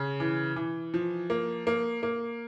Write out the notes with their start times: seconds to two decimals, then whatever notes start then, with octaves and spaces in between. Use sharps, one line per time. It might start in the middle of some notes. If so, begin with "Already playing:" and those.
Already playing: C#3
0.20 E3
0.56 E3
0.94 F3
1.30 A#3
1.67 A#3
2.03 A#3